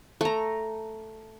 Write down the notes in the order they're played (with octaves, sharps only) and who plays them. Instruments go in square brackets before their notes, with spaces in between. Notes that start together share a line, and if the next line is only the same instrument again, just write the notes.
[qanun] A3 A#5